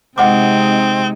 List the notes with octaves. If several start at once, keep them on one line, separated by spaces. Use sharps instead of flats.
C3 G#3 C4 D#4 D#5 F#5 D6